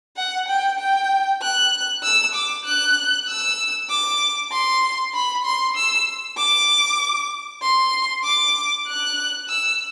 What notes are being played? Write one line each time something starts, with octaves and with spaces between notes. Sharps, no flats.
F#5
G5
G5
F#6
E6
D6
F#6
E6
D6
C6
B5
C6
E6
D6
C6
D6
F#6
E6